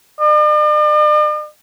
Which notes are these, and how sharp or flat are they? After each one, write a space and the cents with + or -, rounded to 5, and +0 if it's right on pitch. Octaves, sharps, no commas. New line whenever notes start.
D5 +45